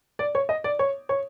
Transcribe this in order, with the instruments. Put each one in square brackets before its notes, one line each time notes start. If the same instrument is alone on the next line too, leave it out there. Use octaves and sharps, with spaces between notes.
[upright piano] D5
C#5
D#5
D5
C#5
C#5